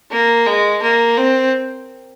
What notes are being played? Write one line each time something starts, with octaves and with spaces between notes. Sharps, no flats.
A#3
G#3
A#3
C4